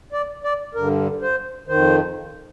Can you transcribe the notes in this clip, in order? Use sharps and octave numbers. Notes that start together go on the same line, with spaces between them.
D5
D5
G2 D3 A#4
C5
F2 D#3 C5